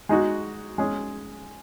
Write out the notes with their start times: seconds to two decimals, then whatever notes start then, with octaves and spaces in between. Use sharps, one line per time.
0.09 G#3 D#4 F#4
0.78 G#3 C#4 G#4